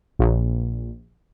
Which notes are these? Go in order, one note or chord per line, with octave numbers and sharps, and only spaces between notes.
A#1